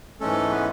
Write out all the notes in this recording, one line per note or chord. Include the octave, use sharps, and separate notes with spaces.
G#2 E3 G#3 A3 C#4 A4
B3 B4